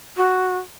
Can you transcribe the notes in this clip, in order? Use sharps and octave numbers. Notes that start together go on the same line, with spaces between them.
F#4